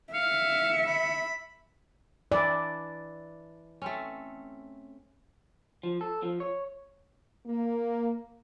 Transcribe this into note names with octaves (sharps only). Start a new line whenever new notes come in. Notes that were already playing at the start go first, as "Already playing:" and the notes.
E5 F5 C#7
B5
E3 D4 E4 D5
A3 C4 C#4
F3
A4
F3
C#5
A#3